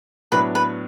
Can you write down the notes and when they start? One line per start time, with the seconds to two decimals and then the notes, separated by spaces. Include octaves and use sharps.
0.32 A2 F#3 B3 D4 B4
0.55 B4